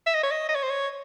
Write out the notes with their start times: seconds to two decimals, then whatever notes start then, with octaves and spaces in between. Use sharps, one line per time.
0.07 E5
0.15 D#5
0.23 C#5
0.31 D#5
0.49 D#5
0.55 C#5
0.63 C5
0.70 C#5